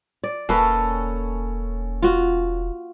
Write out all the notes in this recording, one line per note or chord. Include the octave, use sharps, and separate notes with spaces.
D5
E1 A#3 C#4 A4 B4
F4 F#4